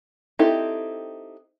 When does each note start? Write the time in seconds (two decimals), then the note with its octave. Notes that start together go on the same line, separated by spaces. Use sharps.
0.39 C4 D#4 E4 G4 A4